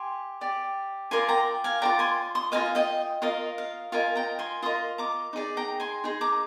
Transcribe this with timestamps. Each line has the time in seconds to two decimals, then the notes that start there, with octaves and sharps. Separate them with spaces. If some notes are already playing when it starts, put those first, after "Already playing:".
Already playing: G4 G#5 C6
0.41 G4 D5
1.11 F4 A#4 D5 G#5 C6
1.29 G5 A#5
1.64 F5 G#5
1.82 F4 A#4 D5 G5 A#5
1.99 G#5 C6
2.35 C6 D#6
2.52 F4 A#4 D#5 F5 G#5
2.75 D#5 G5
3.22 F4 A#4 D#5 F5
3.58 F5
3.92 F4 A#4 D#5 F5 G#5
4.15 G5 A#5
4.39 G#5 C6
4.62 F4 A#4 D#5 C6 D#6
4.98 A#5 D6
5.33 D#4 G#4 D5
5.57 G5 A#5
5.80 G#5 C6
6.04 D#4 G#4
6.21 A#5 D6